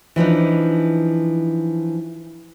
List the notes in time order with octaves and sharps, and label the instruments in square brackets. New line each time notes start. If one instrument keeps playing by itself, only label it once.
[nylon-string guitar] E3 F3 D4 D#4